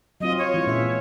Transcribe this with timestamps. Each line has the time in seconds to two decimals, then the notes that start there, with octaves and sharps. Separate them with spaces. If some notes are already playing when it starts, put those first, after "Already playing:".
0.20 F#3 C4 F4 D#5
0.38 C#5
0.54 E3 G#3 F4
0.67 A#2 C#4 E5